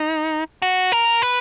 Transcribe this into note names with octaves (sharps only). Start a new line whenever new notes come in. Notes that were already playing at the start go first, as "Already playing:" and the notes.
Already playing: D#4
F#4
A#4
B4